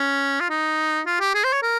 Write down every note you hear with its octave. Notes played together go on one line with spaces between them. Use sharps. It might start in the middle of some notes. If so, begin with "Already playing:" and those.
Already playing: C#4
F4
D#4
F4
G4
G#4
C5
C#5
A#4